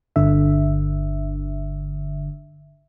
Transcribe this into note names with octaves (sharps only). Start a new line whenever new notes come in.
G1 D3 E5